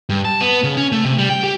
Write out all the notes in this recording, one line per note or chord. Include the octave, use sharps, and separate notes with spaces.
G2
A5
B3
C#3
C#4
A3
C3
G3
G5
G4